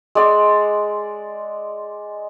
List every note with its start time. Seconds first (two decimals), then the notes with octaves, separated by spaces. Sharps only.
0.15 G#3 D5 E6